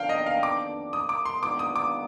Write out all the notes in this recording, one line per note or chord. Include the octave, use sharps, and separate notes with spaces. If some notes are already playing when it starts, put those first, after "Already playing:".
Already playing: F2 D#3 B3 D4 F5 G5
D#5
F5
D6
D#6
D6
C6
D#3 G#3 B3 D4 F4 D6
D#6
D6